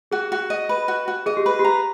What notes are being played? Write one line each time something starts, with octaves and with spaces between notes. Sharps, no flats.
F#4 G#4
F#4
D#5
B4
F#4
F#4
G#4 D#5
G4
B4
G4
A#5